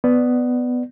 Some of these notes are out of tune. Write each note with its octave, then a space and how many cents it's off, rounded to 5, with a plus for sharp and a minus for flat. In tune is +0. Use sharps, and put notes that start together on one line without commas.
B3 +10 D5 +10